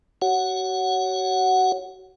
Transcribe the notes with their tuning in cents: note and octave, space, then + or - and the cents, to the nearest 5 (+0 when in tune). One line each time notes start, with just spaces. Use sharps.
F#4 +35 C#5 +0 F#5 +0